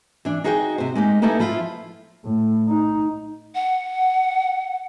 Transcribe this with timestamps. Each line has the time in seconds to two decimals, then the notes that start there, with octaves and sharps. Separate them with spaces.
0.25 E3 D4
0.44 D#4 F#4 G#4 D#5 E5 G5
0.78 C3 C5
0.95 G#3 A#3 D#4 G4
1.22 A#3 B3 D#4 E4 A4 G#5
1.39 F3 E4 F4
2.25 A2
2.68 D#4
3.55 F#5